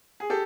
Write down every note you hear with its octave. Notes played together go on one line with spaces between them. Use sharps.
G#4
G4 A4